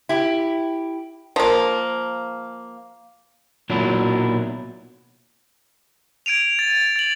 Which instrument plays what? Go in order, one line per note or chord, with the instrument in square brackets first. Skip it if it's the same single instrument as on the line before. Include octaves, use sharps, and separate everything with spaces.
[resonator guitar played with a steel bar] E4 G4
[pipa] F3 A#3
[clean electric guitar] B1 A#2 F#3 D4 E4
[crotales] G#6 D7 D#7 F7
A6
A6 F#7